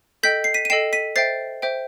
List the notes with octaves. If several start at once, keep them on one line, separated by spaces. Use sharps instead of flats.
A4 D#5 G5 G6 B6
C7
B6 D#7
D#7
A4 D#5 G5 C7 E7
B6 D#7
C5 E5 G5 A6 C7
C5 E5 G5